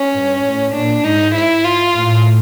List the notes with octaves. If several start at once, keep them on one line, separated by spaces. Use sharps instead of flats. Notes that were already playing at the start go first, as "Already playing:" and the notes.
Already playing: C#4
G2
A2
A#2 D4
G#2 D#4
E4
F4
A2